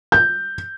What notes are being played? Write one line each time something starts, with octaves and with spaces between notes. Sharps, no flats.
G6